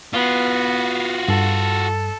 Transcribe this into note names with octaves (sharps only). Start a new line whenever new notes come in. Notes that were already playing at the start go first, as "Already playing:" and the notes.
B3 F4 F#4
G2 A4